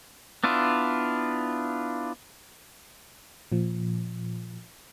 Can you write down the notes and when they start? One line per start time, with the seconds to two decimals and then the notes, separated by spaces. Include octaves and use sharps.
0.44 B3 D4 E4 F4
3.52 A#2 F3